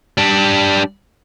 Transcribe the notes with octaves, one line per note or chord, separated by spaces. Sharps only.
G3 D4